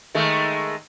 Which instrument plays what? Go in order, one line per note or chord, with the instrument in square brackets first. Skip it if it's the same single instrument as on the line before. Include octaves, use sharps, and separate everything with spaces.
[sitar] D#3 G#3 A3